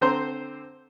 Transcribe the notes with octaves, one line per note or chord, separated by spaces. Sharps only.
D3 C4 C5 A#5 C6